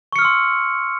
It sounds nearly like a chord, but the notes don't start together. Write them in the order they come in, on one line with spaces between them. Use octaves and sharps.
C#6 C#7 F6 E6 C6